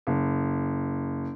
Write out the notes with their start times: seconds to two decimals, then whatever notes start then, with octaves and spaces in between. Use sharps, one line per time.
0.07 F#1